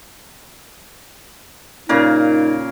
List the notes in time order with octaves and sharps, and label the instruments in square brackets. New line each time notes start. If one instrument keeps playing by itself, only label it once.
[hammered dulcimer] A#2 C#3 A#4 [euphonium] D#4